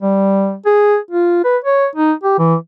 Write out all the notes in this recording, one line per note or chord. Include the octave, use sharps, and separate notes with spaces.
G3
G#4
F4
B4
C#5
D#4
G4
E3